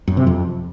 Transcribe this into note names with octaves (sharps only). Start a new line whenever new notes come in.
F#2
C3
F2